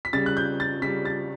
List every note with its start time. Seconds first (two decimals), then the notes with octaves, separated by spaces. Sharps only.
0.05 B6
0.13 C#3 G3 A6
0.26 F#6
0.37 G6
0.60 A6
0.82 C#3 G3 B6
1.05 A6